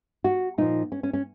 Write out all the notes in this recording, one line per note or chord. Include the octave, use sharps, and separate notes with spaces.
F#4
A#2 F3 D#4
C#4
C#4
C#4